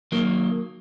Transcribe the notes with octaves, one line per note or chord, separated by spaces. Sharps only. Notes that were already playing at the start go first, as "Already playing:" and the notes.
D#3 F#3 A#3